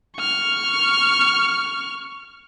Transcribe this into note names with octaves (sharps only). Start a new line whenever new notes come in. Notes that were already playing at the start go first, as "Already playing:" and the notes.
C#6 F6